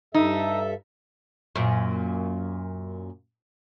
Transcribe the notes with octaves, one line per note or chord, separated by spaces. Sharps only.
G2 D#4 A4 E5
F#2 A#2